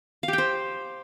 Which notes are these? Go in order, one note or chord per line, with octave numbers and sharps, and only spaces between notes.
F5
G4
G5
C5